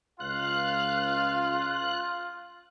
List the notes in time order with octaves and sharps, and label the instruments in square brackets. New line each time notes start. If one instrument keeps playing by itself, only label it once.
[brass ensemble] C#2 F5 [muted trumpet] F4 [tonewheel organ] F#6